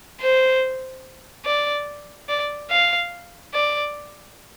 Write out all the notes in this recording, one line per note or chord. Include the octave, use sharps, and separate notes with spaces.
C5
D5
D5
F5
D5